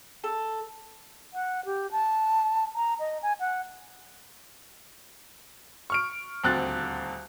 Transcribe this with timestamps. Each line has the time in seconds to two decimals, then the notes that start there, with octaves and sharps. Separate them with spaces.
0.24 A4
1.34 F#5
1.66 G4
1.92 A5
2.75 A#5
3.00 D#5
3.23 G#5
3.40 F#5
5.90 C#6 F6 D7
6.43 D#1 D2 C4 F#6 A6